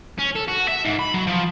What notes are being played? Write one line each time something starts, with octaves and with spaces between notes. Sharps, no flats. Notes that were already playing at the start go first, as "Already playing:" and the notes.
C#4
A4
F#4
E5
G#2
B5
F#3
F3